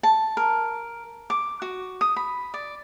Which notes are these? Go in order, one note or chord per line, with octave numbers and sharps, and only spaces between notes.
A5
A#4
D6
F#4
D#6
B5
D5